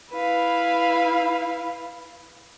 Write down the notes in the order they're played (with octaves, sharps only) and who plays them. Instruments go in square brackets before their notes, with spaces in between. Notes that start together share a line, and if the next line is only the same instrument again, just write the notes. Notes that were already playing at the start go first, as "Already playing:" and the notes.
[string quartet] E4 B4 F5